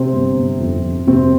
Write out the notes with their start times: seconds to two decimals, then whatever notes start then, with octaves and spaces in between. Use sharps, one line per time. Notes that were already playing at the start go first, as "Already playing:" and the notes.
Already playing: C3 C4
0.13 G1
0.36 G1
0.60 F2
0.83 F2
1.06 G1 C3 C4